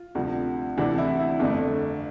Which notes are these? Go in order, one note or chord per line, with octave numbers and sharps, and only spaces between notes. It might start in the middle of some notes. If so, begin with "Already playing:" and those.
Already playing: F4
D2 C3 F3
D2 C3 E3 D4
E4
E4
G1 F2 D3 A3 D4